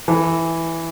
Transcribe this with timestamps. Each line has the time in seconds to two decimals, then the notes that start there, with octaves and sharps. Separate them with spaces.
0.08 E3